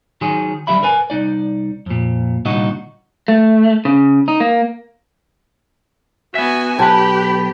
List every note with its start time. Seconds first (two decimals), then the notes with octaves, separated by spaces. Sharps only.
0.21 D#3 F#3 G#4 C6
0.67 D3 F#3 G3 E5 B5
0.83 A#4 B4 G#5
1.10 C2 D#4 D5
1.86 F2 A#2
2.45 C2 A#2 D3 D#4 F#4 D#5
3.28 A3
3.85 C#3
4.28 D#4
4.40 A#3
6.35 B3 F#4 E5 G#5
6.79 B1 G4 B4 A5 B5